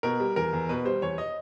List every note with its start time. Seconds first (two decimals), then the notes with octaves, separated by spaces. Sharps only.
0.03 B2 A#4
0.20 G3
0.36 E2 A#4
0.53 E2
0.69 B2 B4
0.85 G3 C5
1.02 E2 C#5
1.18 D#5